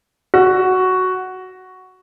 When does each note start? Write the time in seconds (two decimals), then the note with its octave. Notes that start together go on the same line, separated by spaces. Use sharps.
0.34 F#4